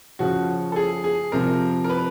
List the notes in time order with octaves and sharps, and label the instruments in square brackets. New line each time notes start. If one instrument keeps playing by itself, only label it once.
[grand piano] C#3 F3 F#4
A4
G#4
G#4
C3 F3 A#4
A#4
B4